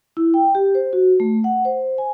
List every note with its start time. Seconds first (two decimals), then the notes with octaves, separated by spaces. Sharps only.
0.17 E4
0.34 G5
0.55 G4
0.75 C5
0.93 F#4
1.20 A3
1.44 F#5
1.65 C5
1.98 G#5